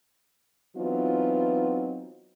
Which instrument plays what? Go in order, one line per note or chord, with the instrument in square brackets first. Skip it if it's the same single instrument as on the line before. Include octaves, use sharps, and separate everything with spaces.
[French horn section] E3 F#3 B3 C4 D#4 F4